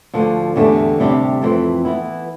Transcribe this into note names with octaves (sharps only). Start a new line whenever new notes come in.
D2 D3 F3
E2 D3 A3 D4 G4
D2 C3 G3 D4 G4
F2 E3 A3 C4
E3 B3 E4